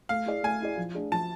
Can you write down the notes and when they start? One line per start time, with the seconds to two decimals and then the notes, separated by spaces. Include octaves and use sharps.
0.09 A3 F5
0.26 E4 G#4 D5
0.43 A3 G#5
0.61 E4 G#4 D5
0.77 F3
0.95 A3 D4 G#4
1.12 F3 A5